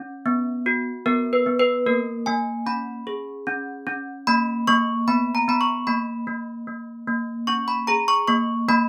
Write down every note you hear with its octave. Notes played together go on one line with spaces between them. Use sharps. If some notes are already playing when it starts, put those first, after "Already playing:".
Already playing: C#4
B3
F#4
B3 A#4
B4
B3
B4
A#3 A#4
A#3 G#5
C#4 B5
G#4
C#4
C#4
A#3 B5
A#3 C#6
B3 B5
A#5
B3 B5
C#6
A#3 B5
A#3
A#3
A#3
C#4 C#6
B5
G#4 A#5
C#6
A#3 C#6
A#3 B5